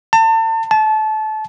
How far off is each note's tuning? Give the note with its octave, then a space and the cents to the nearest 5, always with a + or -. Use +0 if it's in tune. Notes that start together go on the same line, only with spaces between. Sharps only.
A5 +35
A5 -25